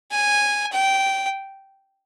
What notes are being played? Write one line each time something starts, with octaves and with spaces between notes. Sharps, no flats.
G#5
G5